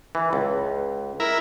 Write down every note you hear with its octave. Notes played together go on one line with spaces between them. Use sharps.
E3
C#2
E4 A#4